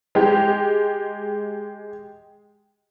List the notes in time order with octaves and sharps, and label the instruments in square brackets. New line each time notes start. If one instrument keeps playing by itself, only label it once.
[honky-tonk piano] G#3 G4